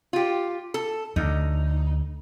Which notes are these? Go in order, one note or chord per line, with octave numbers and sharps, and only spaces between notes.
F4 G4
A4
D2 D#4